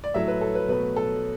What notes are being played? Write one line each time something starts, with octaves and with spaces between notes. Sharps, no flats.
D5
A2 F#3 A3 E5
B4
A4
B4
B2 F#3 A3 B4
A4